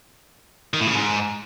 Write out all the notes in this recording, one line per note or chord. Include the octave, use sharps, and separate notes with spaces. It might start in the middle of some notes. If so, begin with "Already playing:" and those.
D#3
A2
C#3
G#2